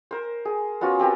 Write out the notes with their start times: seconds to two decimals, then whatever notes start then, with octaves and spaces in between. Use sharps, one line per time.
0.11 A#4 C5
0.45 G#4
0.81 B3 C#4 F4 F#4
0.99 C4 G4 A#4 B4